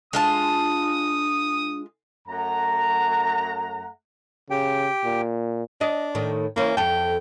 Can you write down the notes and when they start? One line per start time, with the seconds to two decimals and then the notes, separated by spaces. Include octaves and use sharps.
0.13 G#3 D4 F4 A5 D#6
2.28 F#2 A3 F#5 A#5
4.50 C#3 G4 G5
5.04 A#2
5.81 D4 D#5
6.15 A2 D#3
6.56 E3 A#3 C#4 E4
6.77 F2 A4 G5